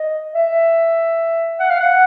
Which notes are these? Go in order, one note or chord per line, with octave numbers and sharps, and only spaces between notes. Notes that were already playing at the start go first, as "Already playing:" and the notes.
Already playing: D#5
E5
F#5
F5
F#5